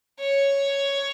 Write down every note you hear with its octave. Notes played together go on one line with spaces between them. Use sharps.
C#5